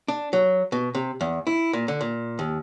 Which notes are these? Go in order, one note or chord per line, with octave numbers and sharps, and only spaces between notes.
D4
F#3
B2
C3
E2
E4
A#2
D3
A#2
D#2